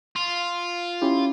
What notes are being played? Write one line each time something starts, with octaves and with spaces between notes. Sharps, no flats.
F4
C#4 E4 G4